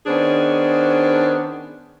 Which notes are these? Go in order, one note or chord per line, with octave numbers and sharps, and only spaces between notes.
D#3 B3 C#4 D4 G#4 C5